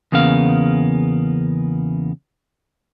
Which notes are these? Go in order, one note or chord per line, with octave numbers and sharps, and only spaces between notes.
E2 C#3 A#3 B3 F5